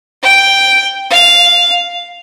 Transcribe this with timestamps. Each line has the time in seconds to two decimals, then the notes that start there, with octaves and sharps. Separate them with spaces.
0.23 G5
1.10 F5